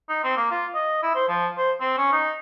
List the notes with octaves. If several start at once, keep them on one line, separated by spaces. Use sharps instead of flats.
D#4
C4
A#3
F4
D#5
E4
C5
F3
C5
C4
C#4
D#4